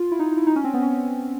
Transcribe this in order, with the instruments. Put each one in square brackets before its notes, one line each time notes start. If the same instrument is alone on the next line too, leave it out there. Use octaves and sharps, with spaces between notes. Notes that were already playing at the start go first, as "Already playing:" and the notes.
Already playing: [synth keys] F4
E4
D#4
D#4
E4
D#4
C#4
C4
B3
C#4